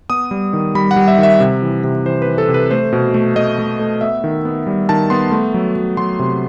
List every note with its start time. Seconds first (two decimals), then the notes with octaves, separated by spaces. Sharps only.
0.10 B3 D#6
0.31 G3
0.53 D#3
0.75 G3 B5
0.91 F#5
0.96 G3
1.08 E5
1.18 D#3
1.23 E5
1.40 C3
1.62 E3
1.84 C3
2.05 E3 C5
2.22 E3 B4
2.38 A4
2.49 C3
2.54 B4
2.71 A3 C5
2.93 B2
3.14 A3
3.36 A3 D#5
3.58 A3
3.79 A3
4.01 B3 E5
4.24 D#3
4.45 B3
4.67 G3
4.89 D#3 A5
5.10 B3 C6
5.32 A3
5.54 F#3
5.76 F#3
5.97 F#3 C6
6.19 C3